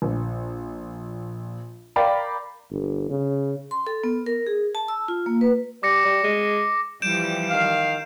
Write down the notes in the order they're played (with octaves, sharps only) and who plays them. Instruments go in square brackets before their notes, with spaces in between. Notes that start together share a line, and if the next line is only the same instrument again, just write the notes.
[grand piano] A#1
A#4 D5 F5 G5 A#5 B5
[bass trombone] G1
C#3
[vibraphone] C6
A4
B3
A#4
G#4
A5
E6
F4
A#3
B4
[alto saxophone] G3 [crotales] D6 A#6 C#7
[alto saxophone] G3
G#3
[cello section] E3 F3 G3 [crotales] G6 D7 E7
[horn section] D#3 F5